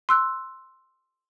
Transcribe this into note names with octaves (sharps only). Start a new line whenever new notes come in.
C6 E6 F#6